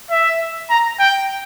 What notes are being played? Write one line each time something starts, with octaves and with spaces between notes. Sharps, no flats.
E5
A#5
G5